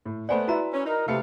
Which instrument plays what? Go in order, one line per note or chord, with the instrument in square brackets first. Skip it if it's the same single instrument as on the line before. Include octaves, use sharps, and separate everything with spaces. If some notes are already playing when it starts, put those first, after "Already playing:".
[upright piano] A2
[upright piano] A3 C5 F#5 [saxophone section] B3 [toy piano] D5 G#5 B5
[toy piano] E4 F#4 A#5 [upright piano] B4 E5
[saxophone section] C#4
[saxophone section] D#4 [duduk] A#4
[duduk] C3 [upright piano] A3 B4 C#7 [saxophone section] A4 F5